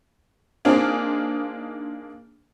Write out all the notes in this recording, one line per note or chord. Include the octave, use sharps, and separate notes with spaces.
A#3 C4 D4 D#4 F4 G#4